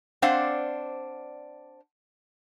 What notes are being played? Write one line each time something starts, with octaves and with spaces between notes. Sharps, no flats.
C4 D4 C5 D5 F5 F#5